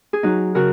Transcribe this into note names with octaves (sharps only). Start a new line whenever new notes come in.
G#4
F#3 D#4 F#4
C#3 F#4 A#4